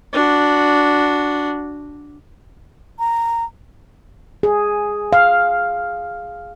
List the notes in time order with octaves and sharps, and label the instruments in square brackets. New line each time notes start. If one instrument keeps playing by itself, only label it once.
[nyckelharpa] D4 F#4
[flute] A#5
[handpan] G#4
F5